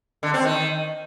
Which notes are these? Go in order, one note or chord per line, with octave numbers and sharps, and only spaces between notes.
D3
C4
D#3